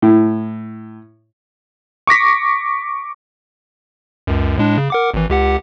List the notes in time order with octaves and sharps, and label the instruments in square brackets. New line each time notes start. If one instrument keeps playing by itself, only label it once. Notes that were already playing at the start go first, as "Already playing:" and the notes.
[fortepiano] A2
[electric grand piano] C#6 D6 A#6 B6
[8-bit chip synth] C#2 F#2
A2 G#3 D4
C#3
A#4 F#5 D6
G#1 E3
C#2 G4 F#5